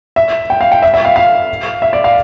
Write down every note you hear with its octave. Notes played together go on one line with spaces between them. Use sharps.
E5
G5
F5
G5
E5
E5
F5
F5
E5
D5
F5